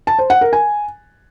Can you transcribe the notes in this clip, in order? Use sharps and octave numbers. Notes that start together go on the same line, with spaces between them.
A5
C5
F#5
A#4
G#5